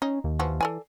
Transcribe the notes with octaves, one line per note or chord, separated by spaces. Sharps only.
C#4 D#4
D#2
E3 F3 F#4
E3 A4 D5 G#5